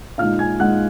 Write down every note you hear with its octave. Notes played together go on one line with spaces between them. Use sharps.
A#2 G#3 D#4 F5 F6
G#5 G#6
A#2 G#3 D#4 F#5 F#6